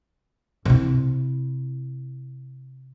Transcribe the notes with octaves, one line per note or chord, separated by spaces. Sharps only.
C3 E4